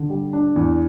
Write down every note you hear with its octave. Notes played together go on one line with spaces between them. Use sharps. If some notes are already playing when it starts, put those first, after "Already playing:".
Already playing: D3
G3
D4
E2